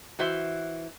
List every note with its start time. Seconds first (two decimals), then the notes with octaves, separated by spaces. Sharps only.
0.19 E3 F#4 C5 E5